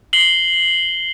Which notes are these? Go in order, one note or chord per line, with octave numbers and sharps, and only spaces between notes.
C7 F#7 G7